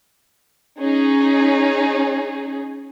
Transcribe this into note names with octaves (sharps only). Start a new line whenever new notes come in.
C#4 D#4 G#4